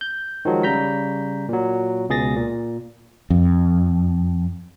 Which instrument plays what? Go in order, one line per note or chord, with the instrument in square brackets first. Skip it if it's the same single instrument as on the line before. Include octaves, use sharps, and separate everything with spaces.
[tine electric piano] G6
D#3 F3 F#3 G#3
C#3 G3 A#5 G6 B6
A#2 F#3
C#2 B2 G#4 A6 A#6
A#2
[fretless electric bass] F2